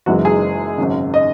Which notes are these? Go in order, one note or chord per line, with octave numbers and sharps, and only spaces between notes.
F#1 F#2 E3 G#3 F#4
G#4
G#1 F#2 C#3
D#5